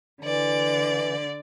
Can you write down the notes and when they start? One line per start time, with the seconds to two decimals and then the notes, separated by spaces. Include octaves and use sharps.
0.23 D3 E3 D5